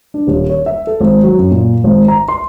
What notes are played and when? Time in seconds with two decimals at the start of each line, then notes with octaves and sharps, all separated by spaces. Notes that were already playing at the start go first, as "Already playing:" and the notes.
0.14 D4
0.27 D#1
0.50 C#5
0.66 E5
0.87 A4
1.00 G#1
1.23 F#3
1.39 F#2
1.51 A#2
1.84 G#1
2.08 A#5
2.28 C6